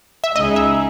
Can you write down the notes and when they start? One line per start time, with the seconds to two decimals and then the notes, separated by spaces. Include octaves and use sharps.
0.24 E5
0.36 C#2 C#3 G#3 D#4 G#4 D#5
0.56 E5